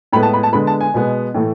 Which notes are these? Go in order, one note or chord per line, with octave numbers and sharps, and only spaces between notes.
A2 G#3 B3 B5
A5
B5
A5
D3 G#3 B3 B5
A5
G#5
B2 G#3 B3
A2 E3 A3